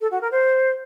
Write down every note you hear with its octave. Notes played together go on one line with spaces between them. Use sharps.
A4
F#4
A#4
C5